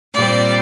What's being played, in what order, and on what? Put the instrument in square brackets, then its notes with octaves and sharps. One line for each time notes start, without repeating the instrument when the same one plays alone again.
[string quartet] A#2 G3 C4 D5